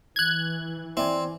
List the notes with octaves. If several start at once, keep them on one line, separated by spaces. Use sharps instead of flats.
E3 F#6 G#6
C4 E4 D5 G#5